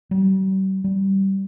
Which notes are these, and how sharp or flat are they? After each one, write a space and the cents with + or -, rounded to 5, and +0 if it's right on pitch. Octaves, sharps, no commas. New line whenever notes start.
G3 -40
G3 -15